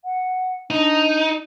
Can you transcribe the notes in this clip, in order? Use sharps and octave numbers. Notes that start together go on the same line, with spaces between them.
F#5
D4 D#4